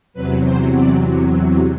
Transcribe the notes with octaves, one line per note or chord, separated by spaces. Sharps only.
E2 C3 F#3 B4
C5
D5